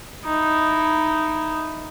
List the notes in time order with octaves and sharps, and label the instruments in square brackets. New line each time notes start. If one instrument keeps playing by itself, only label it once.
[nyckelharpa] D#4 E4